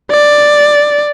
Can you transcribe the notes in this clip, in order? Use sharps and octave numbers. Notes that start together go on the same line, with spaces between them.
D5